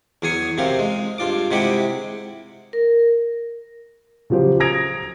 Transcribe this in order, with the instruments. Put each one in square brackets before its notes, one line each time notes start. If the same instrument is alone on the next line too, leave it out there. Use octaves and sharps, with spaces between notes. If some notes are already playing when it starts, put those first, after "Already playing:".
[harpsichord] E2 F#3 G#4 G#5 C#6
F#2 C3 C4 F5
G#3
G2 F4 D6
C3 G#3 E4 G4 F#5 D6
[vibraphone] A#4
[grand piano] C#3 F3 F#3 G4 C5
A#5 D#6 G#6 A#6 D7 F7